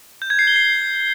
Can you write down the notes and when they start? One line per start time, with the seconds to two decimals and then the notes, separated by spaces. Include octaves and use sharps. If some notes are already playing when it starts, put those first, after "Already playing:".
0.22 G6
0.30 G#6
0.39 C7
0.47 G7
0.56 C7